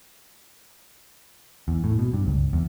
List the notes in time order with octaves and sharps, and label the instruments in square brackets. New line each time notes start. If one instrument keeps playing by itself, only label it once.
[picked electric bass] E2
A2
B2
G2
C#2
E2